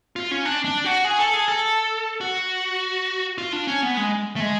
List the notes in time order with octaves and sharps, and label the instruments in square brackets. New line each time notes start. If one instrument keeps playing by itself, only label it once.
[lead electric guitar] F4
C#4
D4
D4
F#4
G#4
A4
G#4
A4
F#4
F4
D4
C#4
B3
G#3
A3
G#3